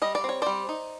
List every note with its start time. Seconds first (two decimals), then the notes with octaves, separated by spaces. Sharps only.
0.02 G3 D#5
0.15 D5
0.24 C4
0.29 C#5
0.42 G3 C5 D5
0.69 D#4